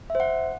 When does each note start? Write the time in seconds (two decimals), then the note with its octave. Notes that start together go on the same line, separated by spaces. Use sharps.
0.10 E5
0.15 C5
0.20 F#5